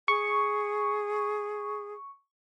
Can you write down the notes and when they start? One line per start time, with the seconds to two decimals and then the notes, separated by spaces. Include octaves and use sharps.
0.08 G#4 C#6